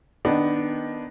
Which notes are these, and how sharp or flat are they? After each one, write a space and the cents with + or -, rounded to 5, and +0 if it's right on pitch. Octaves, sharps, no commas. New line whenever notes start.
D#3 -10 B3 +0 D4 +0